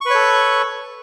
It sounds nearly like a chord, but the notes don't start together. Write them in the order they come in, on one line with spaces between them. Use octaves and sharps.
C#6 B4 C#5 A4